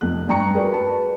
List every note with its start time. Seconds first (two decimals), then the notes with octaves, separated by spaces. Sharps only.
0.01 F1 F2 F#6
0.28 G2 D5 G5 A#5 C#6 C#7
0.54 F#4 G#4 A#4 B4 D5
0.72 B4 A5